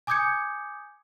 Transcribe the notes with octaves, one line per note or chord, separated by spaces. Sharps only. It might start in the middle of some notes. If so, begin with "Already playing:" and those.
G#5 D6 D#6 G6 G#6 C#7